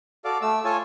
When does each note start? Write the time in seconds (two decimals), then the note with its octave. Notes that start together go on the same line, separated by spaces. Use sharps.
0.25 F#4 A4 D5 F5 D6
0.42 A3 E6
0.65 F4 A4 C#5 G#5 A5